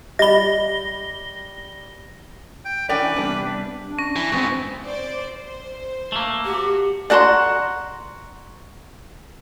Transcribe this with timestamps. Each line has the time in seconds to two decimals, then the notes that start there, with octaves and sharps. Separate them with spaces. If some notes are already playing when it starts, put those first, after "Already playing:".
0.19 G3 G4 D#5 B5 A#6 G7
2.65 G5
2.89 E3 C#4 D4 A#4 B4 D5 G5
3.16 C3 G3 B3 D4
3.81 D4
3.99 C#4 A#6
4.16 E3
4.32 G#2 B3 C4 C#6 A6
4.85 C5 D5
5.33 C5
6.12 A3 A#3
6.45 F#4 G4
7.10 F#4 D5 F#5 A5 A#5 C6